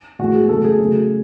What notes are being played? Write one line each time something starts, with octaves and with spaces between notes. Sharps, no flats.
A2 E3 G#3 F#4
G#4
C#3 F#3 A3 A4
G#4
C#3 F#3 A3